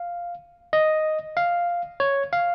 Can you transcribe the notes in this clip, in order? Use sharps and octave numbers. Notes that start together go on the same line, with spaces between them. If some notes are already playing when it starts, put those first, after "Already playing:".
Already playing: F5
D#5
F5
C#5
F5